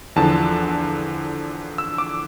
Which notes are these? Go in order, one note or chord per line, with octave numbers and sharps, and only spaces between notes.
E2 D3 F3 A5
E6
D6